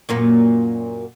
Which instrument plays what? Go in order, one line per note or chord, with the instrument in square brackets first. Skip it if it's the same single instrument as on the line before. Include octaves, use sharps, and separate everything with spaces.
[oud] F#2 A#2 A#3